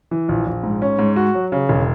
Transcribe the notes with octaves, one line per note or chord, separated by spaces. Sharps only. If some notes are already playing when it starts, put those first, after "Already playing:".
E3
A#1
A#1
G#2
C#4
G#2
F#4
F#3
C#3
E1